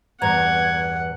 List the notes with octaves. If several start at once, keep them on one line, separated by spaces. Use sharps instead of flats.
E2 G2 F#5 A#5 G#6